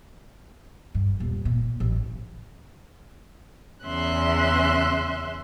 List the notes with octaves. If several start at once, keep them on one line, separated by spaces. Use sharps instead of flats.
G2
D#1
A#2
A1
C#3
E2 C#3 C#4 E5 C6 F#6